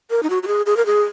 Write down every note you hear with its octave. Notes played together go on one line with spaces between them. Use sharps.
A#4
D#4
F#4
F#4
G#4
G#4
A#4
G#4